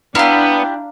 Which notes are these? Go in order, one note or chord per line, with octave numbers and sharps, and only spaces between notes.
B3 D4 E4 G4 F5 A#5 F6